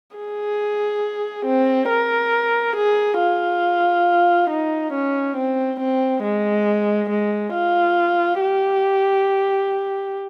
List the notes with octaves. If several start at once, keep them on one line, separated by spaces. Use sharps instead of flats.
G#4
C4
A#4
G#4
F4
D#4
C#4
C4
C4
G#3
G#3
F4
G4